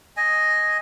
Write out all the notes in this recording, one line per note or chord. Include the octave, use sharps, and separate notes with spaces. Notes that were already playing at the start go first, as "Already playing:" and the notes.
D#5 G#5